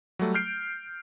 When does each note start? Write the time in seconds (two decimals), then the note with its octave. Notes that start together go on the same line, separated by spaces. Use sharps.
0.19 F#3 G3 A3
0.34 F6 G6 C7 D7